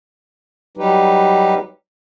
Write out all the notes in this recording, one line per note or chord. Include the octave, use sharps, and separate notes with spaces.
F#3 G3 D#4 G4 B4